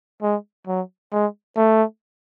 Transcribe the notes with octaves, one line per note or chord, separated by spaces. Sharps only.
G#3
F#3
G#3
A3